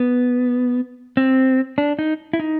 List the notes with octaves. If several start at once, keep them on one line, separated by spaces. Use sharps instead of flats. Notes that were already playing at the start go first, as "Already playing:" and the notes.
Already playing: B3
C4
D4
D#4
E4
D#4